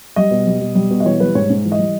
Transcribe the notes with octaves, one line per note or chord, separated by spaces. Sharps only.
G3 D#5
B2
G3
B2
G3
B2
D#5
E3 C#5
G3 B4
G#2 C#5
G#2
E3
D#5
G3